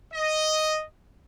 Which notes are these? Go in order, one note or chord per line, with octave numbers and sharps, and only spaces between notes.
D#5